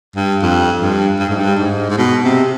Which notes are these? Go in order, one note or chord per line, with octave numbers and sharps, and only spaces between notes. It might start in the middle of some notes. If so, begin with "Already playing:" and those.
G2
F2
G2
G2
G#2
G2
G#2
G#2
B2
C3